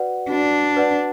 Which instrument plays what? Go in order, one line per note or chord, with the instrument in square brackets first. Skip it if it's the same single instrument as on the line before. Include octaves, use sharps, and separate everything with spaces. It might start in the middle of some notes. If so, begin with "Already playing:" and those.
Already playing: [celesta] F#4 B4 D5 F#5
[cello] D4 [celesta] F#4
[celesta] B4 D5 F#5